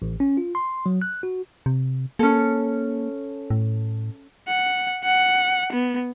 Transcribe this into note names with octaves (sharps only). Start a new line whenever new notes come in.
A1
C#4
F4
C6
F#3
F#6
F#4
C3
A#3 C#4 A4
A2
F#5
F#5
B3